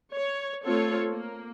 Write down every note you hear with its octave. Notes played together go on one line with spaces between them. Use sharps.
C#5
A3 C4 F4 A4 C#5
A#3